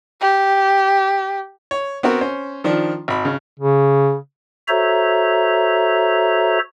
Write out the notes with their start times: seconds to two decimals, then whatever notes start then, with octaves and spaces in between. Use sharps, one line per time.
0.21 G4
1.71 C#5
2.03 B3 C4 F#4 A#4
2.21 C#4 C5
2.64 D#3 F3 D4
3.08 G#1 B5
3.25 C#3
3.59 C#3
4.68 F#4 A4 C5 C#5 E5 A#5